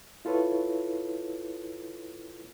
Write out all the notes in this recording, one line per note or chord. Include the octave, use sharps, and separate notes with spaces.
E4 F4 A4 B4 C#5